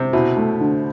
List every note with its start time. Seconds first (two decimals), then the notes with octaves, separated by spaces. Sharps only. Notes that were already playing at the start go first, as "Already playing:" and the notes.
Already playing: C3 C5
0.13 B2 E4
0.37 A3
0.60 D3